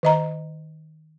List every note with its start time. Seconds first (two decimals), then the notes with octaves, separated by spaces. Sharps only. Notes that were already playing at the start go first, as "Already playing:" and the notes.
0.03 D#3 D#5 A#5